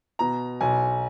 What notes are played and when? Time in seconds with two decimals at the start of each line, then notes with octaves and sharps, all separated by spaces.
0.19 B2 A#5
0.61 B1 G#5